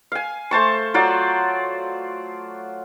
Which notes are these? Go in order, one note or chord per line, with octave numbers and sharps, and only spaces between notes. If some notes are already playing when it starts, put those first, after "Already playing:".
F5 G#5
A3 C5 A5 C#6
F#3 F4 C5 D5